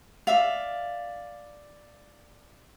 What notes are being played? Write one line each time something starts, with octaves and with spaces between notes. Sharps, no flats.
D5 E5 F5